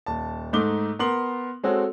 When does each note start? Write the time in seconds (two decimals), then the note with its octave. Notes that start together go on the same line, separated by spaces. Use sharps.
0.06 D#1 A5
0.53 G#2 A3 D#4 D6 G7
0.99 B3 A#4 C6 F#7
1.63 G#3 C4 F#4 A4 C#5